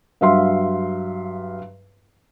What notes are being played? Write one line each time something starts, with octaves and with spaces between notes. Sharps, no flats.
G2 F#3 E5 F5 C6